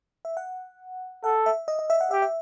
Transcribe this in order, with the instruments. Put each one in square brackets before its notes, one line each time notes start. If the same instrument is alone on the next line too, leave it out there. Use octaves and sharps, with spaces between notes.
[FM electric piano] E5
F#5
[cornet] A4 [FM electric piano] F#5
[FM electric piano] E5
D#5
D#5
E5
F#5
[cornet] G4 [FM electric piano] E5
[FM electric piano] E5